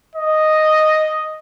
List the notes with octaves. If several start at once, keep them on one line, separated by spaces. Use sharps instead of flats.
D#5